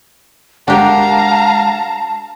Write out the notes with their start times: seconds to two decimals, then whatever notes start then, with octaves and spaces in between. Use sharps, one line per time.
0.68 G#3 D4 G4 A#4 F5 F#5 A5 A#5